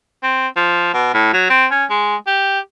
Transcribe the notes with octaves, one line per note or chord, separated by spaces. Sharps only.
C4
F3
B2
A2
F#3
C4
C#4
G#3
G4